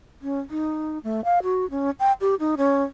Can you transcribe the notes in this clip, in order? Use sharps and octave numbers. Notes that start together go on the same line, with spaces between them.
C#4
D#4
A3
F5
F#4
C#4
G5
G4
D#4
C#4